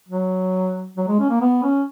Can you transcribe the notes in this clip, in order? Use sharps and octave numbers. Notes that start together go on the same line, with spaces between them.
F#3
F#3
G#3
C#4
A#3
B3
C#4